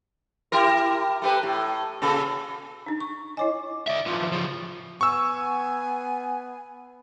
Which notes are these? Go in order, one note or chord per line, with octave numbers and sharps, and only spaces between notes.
E4 G4 A#4
A3 G4 B4
A2
A#2 C#3 A4
D4 D#4
C#6
E4 C#5 D#5 G#5 D6
D5 E5
E3 F3
C#3 F3
B3 G#5 C#6 E6